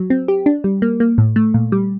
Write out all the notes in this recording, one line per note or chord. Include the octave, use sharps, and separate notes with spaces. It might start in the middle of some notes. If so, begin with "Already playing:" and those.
Already playing: F#3
C4
G4
D4
G3
A#3
A#3
A2
A3
A#2
G3